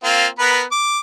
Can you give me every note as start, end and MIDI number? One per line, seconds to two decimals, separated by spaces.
0.04 0.27 58
0.04 0.27 60
0.04 0.27 65
0.39 0.63 59
0.39 0.63 70
0.39 0.63 71
0.72 0.99 86